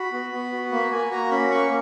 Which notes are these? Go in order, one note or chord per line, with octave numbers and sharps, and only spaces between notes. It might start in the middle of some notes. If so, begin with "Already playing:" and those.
Already playing: F#4 B5
B3
B3
F#4
A#3 B5
A#3 G#5
F#4 A#5
C#4 B5
A#3 C#6